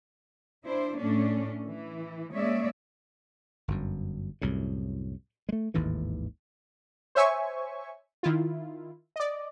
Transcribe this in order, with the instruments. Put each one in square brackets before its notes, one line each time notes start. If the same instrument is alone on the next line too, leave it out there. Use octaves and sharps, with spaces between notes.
[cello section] D4 E4 C5
A2 A3 C#4 D4
E3
G#3 A#3 C#4 C#5 D5 E5
[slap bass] G1 F#2
C2 F#2 A2
G#3 A3
G#1 D#2 A2 E3
[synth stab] C5 C#5 E5 G#5 C#6
D#3 E4 F4
D5 D#5